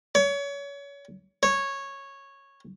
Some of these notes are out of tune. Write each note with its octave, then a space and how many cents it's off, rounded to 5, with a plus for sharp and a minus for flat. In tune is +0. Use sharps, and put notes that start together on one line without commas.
C#5 +30
C#5 -10